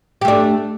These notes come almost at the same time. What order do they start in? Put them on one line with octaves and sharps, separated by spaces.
G4 A3 D4